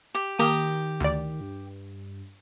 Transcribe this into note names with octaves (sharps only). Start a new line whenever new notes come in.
G4
D#3 A#3 G4 A#5 D#6
D2 D5
G2